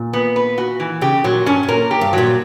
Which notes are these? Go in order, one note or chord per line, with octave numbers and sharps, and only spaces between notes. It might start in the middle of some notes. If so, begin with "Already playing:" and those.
Already playing: A#2
B3
B4
F#4
E3
C#3 G4
A#2 F#3
G2 C#4
G2
A#2 A#4
G4
G2
A#2 F#3